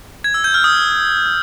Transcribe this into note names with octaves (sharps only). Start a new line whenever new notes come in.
G#6
E6
G6
F6
D#6